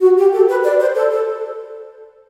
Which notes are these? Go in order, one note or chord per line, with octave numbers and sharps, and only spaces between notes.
F#4
G4
A4
B4
D5
C5
A4
A4